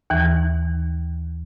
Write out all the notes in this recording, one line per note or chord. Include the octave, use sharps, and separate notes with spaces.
D#2 E3